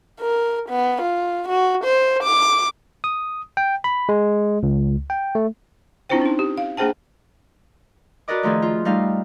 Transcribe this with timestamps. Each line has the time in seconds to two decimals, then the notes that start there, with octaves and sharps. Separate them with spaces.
0.21 A#4
0.69 B3
1.02 F4
1.49 F#4
1.84 C5
2.24 D6
3.04 D#6
3.57 G5
3.84 B5
4.09 G#3
4.63 C#2
5.10 G5
5.35 A3
6.09 C4 D4 E4 F4 C5 G5
6.22 C#4 D#4
6.39 G4
6.58 F5
6.77 A#3 D4 G#4 C5 G5 A5
8.28 F#4 A#4 B4 D5 D#5 D6
8.43 D#3 F3 A3 G#4
8.62 F4
8.85 G3 A3 D#4 F5